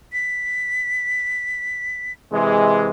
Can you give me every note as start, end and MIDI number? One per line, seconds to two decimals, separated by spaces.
0.13 2.12 95
2.32 2.91 48
2.32 2.91 52
2.32 2.91 56